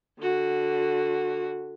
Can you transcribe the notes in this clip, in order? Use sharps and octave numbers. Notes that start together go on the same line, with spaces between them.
D3 F#4